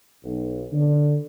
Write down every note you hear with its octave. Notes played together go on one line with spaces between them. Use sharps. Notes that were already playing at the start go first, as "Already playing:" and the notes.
B1
D3